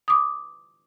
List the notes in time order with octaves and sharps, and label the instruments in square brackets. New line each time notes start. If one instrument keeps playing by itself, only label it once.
[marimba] D6 D#6